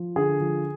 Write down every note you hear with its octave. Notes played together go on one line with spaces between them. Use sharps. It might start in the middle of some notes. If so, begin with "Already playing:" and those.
Already playing: F3
D3 G#4
F3